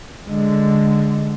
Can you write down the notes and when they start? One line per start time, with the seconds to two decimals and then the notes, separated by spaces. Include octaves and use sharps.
0.28 D3 G#3